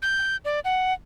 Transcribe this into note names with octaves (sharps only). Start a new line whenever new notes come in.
G6
D5
F#5